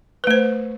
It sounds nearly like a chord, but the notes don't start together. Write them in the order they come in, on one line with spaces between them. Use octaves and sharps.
B4 A3 C5